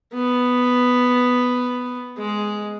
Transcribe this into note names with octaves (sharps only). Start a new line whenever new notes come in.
B3
G#3